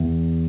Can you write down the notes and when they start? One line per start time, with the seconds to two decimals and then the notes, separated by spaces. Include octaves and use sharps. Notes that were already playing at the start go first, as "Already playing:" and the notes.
Already playing: E2